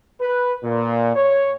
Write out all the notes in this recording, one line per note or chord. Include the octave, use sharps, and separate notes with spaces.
B4
A#2
C#5